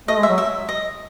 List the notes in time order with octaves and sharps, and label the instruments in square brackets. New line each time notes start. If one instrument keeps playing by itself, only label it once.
[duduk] A3 [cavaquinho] D#5
[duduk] G#3
[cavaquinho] E5
[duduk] F#3
[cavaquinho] E5
D#5